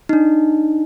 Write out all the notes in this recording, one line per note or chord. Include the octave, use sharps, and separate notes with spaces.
D4 D#4